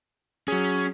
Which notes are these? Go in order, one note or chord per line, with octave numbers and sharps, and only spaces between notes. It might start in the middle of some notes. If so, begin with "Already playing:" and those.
F#3 C#4 G#4